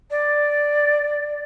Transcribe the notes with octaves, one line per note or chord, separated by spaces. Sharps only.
D5